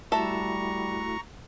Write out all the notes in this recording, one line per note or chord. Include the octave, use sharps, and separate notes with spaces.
G3 A3 E4 F#4 A4 E5 A#5 C#6